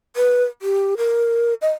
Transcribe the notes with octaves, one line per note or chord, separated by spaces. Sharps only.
B4
G4
A#4
D#5